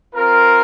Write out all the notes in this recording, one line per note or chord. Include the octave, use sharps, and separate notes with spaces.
C4 F4 A#4